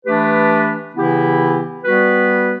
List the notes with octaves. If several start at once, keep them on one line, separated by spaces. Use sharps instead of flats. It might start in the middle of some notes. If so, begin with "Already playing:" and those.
E3 A3 D4 G4 B4
C#3 E3 B3 E4 G4
G3 B3 F#4 B4